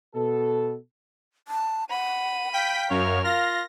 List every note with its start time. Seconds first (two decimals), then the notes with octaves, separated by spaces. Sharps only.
0.15 B2 A4
1.48 A5
1.90 F#5 B5 D#7
2.53 F5 G5 B6
2.90 F#2 A#4 C#5 F6
3.24 F4 F5 A#6